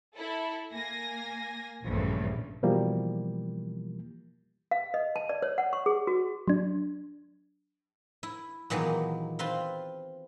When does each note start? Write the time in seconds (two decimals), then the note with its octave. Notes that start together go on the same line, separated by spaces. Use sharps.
0.16 E4 A4
0.72 A#3 G#5 A#6
1.85 A#1 E2 G2 C#3 A3 A#3
2.63 B2 E3 F3 G3 A#3
4.71 F5
4.94 D#5
5.16 A5
5.29 D5
5.42 C#5
5.58 F#5
5.73 C#6
5.86 G#4
6.07 F#4
6.48 F#3 D4
8.23 E4
8.70 A#2 D#3 E3 F#3 G#3 B3
9.39 C4 F4 B4 C6